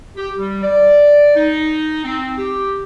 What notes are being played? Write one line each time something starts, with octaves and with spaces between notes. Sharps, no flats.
G4
G3
D5
D#4
C4
G4